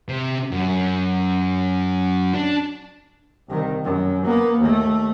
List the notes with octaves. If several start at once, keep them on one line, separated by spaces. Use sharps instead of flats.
C3
F#2
D4
C2 D#3
F#2
A#3 B3
D#2 A3